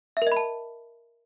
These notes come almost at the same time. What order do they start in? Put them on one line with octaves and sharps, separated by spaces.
E5 A#4 D#5 B5 A5